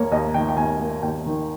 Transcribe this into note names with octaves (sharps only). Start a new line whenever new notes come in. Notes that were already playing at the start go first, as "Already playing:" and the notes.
Already playing: D#2 A#3 C#5
D#2 D#5
D#3 G5
G5
D#2 G#5
A#3
D#2 G5
D#3